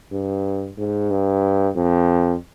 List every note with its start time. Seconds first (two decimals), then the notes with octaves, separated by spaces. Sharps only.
0.12 G2
0.78 G#2
1.10 G2
1.75 F2